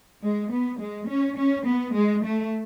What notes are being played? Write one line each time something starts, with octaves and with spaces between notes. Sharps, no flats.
G#3
B3
G#3
C#4
C#4
B3
G#3
A3